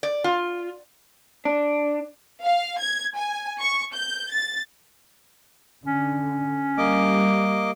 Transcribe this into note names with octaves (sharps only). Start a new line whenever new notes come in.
D5
F4
D4
F5
G#6
G#5
C#6
G6
A6
D3 C#4
G3 A#3 D#5 D6